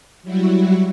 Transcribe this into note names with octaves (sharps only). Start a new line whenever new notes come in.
F#3 G3 E4 F#4